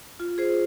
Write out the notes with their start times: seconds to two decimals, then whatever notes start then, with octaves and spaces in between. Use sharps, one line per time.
0.20 F4
0.38 G#4 C5